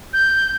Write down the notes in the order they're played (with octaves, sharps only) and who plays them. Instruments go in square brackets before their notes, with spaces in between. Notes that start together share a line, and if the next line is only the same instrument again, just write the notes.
[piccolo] G6